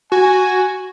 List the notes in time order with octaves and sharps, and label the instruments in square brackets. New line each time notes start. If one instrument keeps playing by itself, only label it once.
[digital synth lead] F#4 [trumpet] G#5